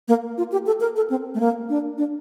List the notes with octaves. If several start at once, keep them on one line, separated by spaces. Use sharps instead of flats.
A#3
F4
G4
A4
A#4
A4
C4
A3
A#3
D4
D4